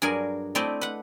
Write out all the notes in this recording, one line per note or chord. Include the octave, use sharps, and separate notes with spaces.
G2 F#3 G#4 A#4 D5 G#5
A3 C4 E4 C5 D5 D#5
B4 F#5